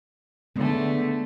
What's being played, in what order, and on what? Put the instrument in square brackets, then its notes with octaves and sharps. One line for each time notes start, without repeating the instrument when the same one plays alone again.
[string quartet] D3 A3 [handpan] G#3 B3